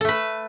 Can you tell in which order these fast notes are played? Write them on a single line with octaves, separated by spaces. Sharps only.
A4 A3 B4